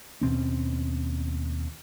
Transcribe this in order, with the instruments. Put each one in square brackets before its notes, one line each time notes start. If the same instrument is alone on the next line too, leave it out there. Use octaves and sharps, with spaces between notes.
[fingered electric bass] D#2 B2 C4 C#4